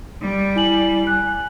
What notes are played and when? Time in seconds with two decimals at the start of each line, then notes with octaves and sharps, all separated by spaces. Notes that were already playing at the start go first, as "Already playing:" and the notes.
0.20 G3
0.56 E4 G#5 F#7
1.07 G#5 F#6